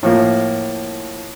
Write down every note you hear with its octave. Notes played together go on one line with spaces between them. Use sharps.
A2 F3 A#3